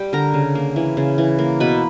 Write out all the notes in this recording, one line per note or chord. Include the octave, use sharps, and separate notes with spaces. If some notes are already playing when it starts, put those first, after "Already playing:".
Already playing: G3 G5
D3 A#4 A#5
C#3
A#3
E3
C#3
E3
A#3
B2 B4 B5